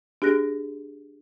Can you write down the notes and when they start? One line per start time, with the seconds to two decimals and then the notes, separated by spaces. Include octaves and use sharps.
0.22 D4 G4 G#4 F#6 A#6